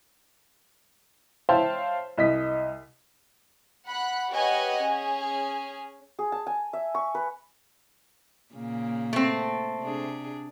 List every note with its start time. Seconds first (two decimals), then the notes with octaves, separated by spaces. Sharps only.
1.49 C5 C#5 E5 F5 G5 A5
2.18 C2 D#5 B6
3.88 F#5 B5 F#6
4.31 G4 B4 C#5 D#5 F#5 G#5
4.81 C#4 G#4
6.19 G#4
6.32 A5
6.47 G#5
6.73 E5
6.95 C#6
7.15 B4
8.54 A#2 C#3 A#3
9.13 A3 C4
9.81 C3 D4 G#4